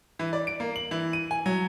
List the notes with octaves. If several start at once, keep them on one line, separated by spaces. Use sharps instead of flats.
E3
D5
D7
A#3
F#7
E3
D#7
G#5
F#3